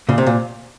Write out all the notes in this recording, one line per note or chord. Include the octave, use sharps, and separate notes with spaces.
A#2 C#3
C3
A#2